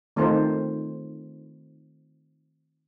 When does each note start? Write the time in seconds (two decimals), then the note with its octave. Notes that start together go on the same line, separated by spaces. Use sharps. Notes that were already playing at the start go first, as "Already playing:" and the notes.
0.16 D#3 A3 C4 D#4 F4 C5